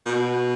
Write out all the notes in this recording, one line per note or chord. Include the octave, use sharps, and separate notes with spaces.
B2